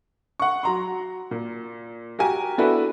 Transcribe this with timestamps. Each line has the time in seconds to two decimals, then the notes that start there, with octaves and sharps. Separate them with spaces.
0.40 F#5 C#6
0.63 F#3 A#5 C6
1.31 A#2
2.19 F#4 G4 A#4 G#5
2.58 B3 D4 E4 F#4 A4 B4